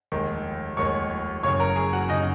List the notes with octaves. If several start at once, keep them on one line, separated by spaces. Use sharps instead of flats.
F1 D#2 D#3 G#3
F1 D#2 D#3 G#3 C#5 C#6
F#1 F#2 C#3 C#5 C#6
A#4 A#5
G#4 G#5
F#4 F#5
F#1 C#3 D#4 D#5